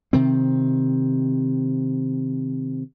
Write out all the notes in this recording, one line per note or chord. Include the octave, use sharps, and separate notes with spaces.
C3 D#3 C4